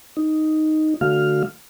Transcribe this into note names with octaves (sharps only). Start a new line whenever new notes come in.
D#4
D3 A3 F#4 F5 F6